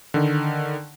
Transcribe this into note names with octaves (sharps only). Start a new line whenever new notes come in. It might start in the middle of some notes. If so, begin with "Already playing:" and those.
D3 D#3